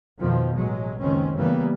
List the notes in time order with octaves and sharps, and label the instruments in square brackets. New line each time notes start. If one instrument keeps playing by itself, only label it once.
[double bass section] F2 B2 D#3 F3
A1 F#3 G#3
F#1 C#2 D#3 C4 C#4
C#3 E3 G3 A#3 B3